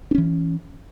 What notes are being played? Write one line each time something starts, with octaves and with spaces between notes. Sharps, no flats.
E3 C#4 D4